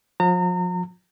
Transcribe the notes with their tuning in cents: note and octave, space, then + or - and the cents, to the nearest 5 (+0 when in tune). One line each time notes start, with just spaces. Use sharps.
F3 +40 A#5 -35